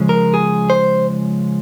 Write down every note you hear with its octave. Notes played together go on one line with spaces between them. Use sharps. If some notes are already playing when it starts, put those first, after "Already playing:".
Already playing: C#3 F3 G#3
A#4
G#4
C5